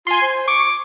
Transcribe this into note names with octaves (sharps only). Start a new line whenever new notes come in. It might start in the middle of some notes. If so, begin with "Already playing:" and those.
F4 G#5 C6
C5
C#6 D6